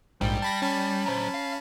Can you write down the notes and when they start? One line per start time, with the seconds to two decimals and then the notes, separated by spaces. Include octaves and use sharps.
0.21 A#1 G#2 G3
0.42 A5 B5 A#6
0.62 C#4 A5 B5
1.06 F#3 C5
1.34 F5